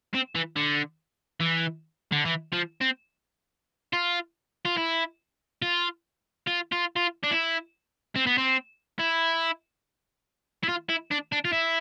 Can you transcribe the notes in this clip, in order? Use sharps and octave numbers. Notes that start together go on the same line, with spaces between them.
C4
E3
D3
E3
D3
E3
F3
C4
F4
F4
E4
F4
F4
F4
F4
D4
E4
C4
B3
C4
E4
E4
F4
E4
D4
D4
F4
E4